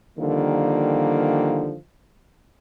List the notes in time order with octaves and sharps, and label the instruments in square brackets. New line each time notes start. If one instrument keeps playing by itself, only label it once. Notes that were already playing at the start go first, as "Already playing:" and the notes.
[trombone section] D3 D#3 F3 G3 A#3